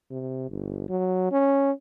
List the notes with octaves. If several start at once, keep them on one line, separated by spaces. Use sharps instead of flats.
C3
G1
F#3
C#4